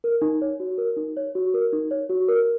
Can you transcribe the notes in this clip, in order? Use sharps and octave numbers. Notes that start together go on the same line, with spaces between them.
A#4
D#4
C#5
F#4
A#4
D#4
C#5
F#4
A#4
D#4
C#5
F#4
A#4